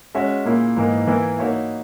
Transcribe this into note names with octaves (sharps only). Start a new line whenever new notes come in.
G#3 C#4 F#4 C#5 E5
A#2 A#3 E4 G#4
G#2 E3 A#3 D#4
E3 A#3 E4 A#4
A#3 D#4 F#4 C#5 E5